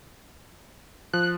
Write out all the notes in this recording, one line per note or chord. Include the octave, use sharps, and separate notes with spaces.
F3 F#6